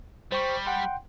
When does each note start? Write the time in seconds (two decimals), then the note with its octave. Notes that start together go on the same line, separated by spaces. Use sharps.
0.32 G3 C5 G5 C#6
0.66 F#5 G5 C6